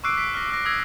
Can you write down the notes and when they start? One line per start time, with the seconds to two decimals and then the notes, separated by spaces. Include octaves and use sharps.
0.04 C#6 D6 E6 F#6 C7 D7
0.17 B6 D7
0.34 F6 A#6
0.50 E6 A#6
0.65 D#6 E6 G#6 A#6 C7